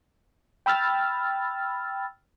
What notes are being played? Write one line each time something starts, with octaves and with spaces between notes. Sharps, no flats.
G5 B5 E6 F6 A6